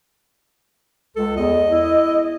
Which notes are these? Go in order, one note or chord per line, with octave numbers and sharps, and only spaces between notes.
C#2 A4
E2 D#5
E4